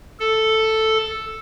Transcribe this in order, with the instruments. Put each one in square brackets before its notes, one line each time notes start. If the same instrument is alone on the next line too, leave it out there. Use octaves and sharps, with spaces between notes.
[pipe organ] A4